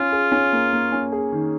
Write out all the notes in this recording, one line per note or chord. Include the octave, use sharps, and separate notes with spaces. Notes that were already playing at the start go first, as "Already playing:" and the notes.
Already playing: C#4 F4
G#4
C#4
A#3
A#3
C#4
G#4
D#3